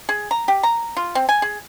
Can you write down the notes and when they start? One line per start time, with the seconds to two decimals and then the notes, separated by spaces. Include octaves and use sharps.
0.09 G#4
0.31 A#5
0.48 G4
0.63 A#5
0.97 F4
1.15 C4
1.29 G#5
1.42 G#4